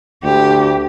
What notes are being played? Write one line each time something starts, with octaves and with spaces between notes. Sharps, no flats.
D2 G4